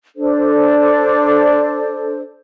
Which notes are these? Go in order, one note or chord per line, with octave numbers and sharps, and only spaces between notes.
D4 A4 C5